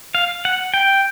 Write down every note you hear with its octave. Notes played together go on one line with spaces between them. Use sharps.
F5
F#5
G5